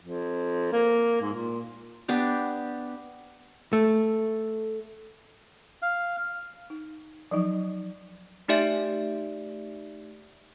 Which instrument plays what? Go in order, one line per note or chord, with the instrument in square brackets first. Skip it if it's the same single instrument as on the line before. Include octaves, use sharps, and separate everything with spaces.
[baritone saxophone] F2
A#3
G#2
A#2
[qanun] B3 D4 G4
[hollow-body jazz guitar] A3
[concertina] F5
[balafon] D#4
F3 F#3 D#4
[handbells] A3 D#4 G4 D5 E5 D7